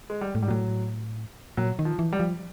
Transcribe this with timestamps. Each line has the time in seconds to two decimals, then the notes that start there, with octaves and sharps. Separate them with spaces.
0.10 G#3
0.21 G3
0.35 A2
0.42 G#2 G3
0.48 A2 F#3
1.57 A#2 F#3
1.79 D#3
1.85 F3
1.99 E3
2.13 G3
2.20 F3